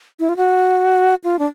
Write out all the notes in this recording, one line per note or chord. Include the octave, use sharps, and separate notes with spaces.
E4
F4
F#4
F4
D4